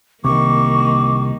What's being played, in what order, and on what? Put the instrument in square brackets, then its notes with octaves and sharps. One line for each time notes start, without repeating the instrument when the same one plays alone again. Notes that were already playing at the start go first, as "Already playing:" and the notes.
[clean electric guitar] C2 [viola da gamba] D#3 A#3 [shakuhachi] C#6 [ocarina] D6